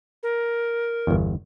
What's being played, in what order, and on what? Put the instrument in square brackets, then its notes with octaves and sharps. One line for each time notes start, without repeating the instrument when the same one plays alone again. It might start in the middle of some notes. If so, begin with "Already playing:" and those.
[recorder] A#4
[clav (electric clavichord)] G1 E2